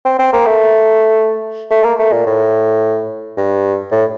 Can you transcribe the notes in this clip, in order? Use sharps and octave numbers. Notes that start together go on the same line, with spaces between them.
C4
C4
A#3
A3
A3
A#3
A3
A#2
A2
G2
A2